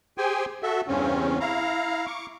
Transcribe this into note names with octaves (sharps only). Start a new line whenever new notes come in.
G4 G#4 C5 G5 G#5
F#4 A4 E5
E2 G2 C#3 C4 C#4
E4 F5 A#5
C#6 D6